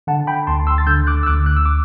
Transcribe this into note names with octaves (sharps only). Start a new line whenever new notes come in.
D3 F#5 A5
G5 B5
D2 A5 C6
C6 E6
A6
D3 E6 G6
D6 F#6
E6
D2 D6 F#6
F#6
E6
D6